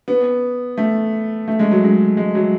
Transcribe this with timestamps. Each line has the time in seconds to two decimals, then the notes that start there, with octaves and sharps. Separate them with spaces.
0.08 B3
0.78 A3
1.48 A3
1.59 G#3
1.71 F#3
1.84 G#3
2.17 G#3
2.35 F#3